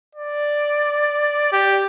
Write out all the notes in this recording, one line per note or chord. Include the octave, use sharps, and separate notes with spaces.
D5
G4